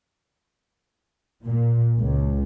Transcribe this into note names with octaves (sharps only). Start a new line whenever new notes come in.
A#2
C#2